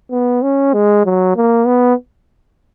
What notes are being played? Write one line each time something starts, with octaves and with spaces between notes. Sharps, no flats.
B3
C#4
G#3
F#3
A#3
B3